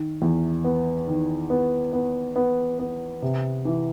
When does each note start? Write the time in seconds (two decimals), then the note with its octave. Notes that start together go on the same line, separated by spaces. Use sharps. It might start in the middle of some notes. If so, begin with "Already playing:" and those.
Already playing: D#3
0.22 E2
0.64 B3
1.07 D#3
1.50 B3
1.93 B3
2.36 B3
2.79 B3
3.22 C3
3.65 E3